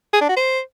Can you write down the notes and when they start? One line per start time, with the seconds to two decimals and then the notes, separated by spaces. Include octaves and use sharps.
0.13 G#4
0.21 D4
0.29 F#4
0.37 C5